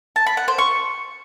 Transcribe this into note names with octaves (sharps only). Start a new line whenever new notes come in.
A5
B5
F#5
C5
C#6